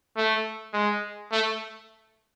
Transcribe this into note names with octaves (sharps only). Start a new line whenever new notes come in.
A3
G#3
A3